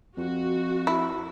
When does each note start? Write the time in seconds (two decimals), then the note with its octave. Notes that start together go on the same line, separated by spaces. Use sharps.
0.17 F2 F#4
0.87 E4